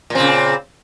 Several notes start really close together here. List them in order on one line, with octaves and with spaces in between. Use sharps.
A#2 C4 C#3